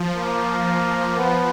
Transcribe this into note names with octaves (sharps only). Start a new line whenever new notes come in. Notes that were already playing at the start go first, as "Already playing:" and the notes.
Already playing: F3
A#3
B3